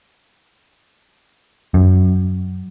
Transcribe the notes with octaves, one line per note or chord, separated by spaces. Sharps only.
F#2